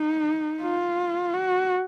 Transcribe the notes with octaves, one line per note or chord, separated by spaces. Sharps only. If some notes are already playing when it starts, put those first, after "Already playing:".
Already playing: D#4
F4
F#4